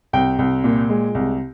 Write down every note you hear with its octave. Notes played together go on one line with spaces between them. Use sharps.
C2 G5
C2
A#2
G#3
C2